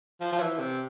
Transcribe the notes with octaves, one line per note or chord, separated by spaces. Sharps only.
F3
F3
E3
C3